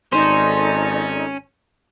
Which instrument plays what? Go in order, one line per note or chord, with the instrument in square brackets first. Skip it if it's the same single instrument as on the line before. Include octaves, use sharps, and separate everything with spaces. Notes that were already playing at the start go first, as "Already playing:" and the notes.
[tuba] G#1 [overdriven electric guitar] C#4 [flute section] D#4 A4 D5 [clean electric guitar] C5